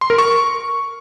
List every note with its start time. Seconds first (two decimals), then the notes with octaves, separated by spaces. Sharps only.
0.01 C6
0.10 A#4
0.18 C#6